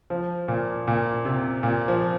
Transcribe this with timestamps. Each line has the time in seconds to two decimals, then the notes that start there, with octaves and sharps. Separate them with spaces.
0.10 F3
0.48 A#2
0.87 A#2
1.25 C3
1.63 A#2
1.88 F3